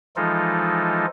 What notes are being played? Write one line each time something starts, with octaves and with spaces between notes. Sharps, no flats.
E3 F3 G#3 D#4 F4 A4